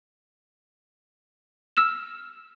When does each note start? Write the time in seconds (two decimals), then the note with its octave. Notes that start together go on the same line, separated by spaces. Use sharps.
1.77 E6 F6 E7